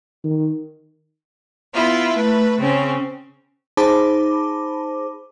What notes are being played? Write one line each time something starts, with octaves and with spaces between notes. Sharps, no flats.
D#3
B3 E4 F4
A3 B4
C#3 C4 C#4
D#4 G#4 C5 A5 B5 D6